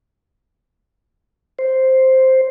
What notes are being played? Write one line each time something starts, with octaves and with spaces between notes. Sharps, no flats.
C5